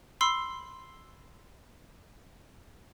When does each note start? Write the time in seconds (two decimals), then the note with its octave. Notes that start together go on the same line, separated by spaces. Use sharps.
0.21 B5 C6 E6 C7